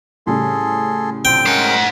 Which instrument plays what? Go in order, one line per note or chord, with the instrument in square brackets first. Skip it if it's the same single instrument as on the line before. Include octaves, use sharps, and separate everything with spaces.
[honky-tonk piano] A2 C#3 G3 [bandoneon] G#4 A4 C6
[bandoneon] D3 F3 C4 [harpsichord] G5
[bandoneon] G#3 C#4 A#4 [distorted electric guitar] C5 F#5